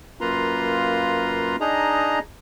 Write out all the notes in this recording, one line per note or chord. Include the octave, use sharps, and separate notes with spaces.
F#2 A#3 F4 B4 A#5 C6
D4 D#4 G#4 D#5 A#5